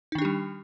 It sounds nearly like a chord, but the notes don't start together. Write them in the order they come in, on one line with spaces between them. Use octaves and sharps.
D#4 D#3 D4 G4 G3